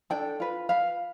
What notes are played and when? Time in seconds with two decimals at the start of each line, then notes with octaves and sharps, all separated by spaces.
0.10 D4 A4 G5
0.40 F4 B4
0.69 F4 B4 F5